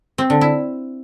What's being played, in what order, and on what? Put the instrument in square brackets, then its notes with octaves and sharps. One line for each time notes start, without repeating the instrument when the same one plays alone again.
[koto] C4
D3
E4